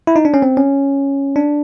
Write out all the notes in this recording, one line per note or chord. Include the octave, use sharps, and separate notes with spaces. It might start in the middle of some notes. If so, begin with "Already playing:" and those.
E4
D#4
D4
C#4
C4
C#4
D4